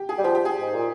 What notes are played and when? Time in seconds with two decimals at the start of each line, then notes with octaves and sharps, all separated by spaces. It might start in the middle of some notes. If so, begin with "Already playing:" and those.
Already playing: G4
0.09 G#4
0.18 G3
0.24 F3 G4
0.35 G4
0.45 G#4
0.61 G#2
0.74 A#2